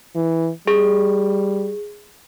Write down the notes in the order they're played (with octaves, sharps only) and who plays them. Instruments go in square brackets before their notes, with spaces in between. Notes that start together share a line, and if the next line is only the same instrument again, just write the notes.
[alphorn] E3
[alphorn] G3 [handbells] G#4